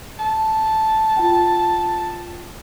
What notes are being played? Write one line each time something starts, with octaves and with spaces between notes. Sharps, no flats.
A5
F4 G5